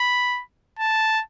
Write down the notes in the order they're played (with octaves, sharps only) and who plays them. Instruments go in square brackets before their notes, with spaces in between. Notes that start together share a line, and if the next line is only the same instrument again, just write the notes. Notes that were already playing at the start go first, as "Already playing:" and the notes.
Already playing: [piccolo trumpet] B5
A5